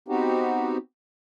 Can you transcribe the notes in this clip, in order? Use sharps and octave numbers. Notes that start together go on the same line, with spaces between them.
B3 C4 D#4 F#4 G4